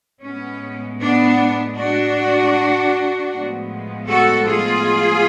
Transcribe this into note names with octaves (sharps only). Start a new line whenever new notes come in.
A2 G#3 B3 C#4
B3 D4
D4 F#4
A2 F3 G#3 B3
F#4 A4
F4 G#4